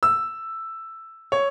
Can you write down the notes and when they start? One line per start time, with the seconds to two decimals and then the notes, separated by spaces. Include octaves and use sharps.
0.03 E6
1.32 C#5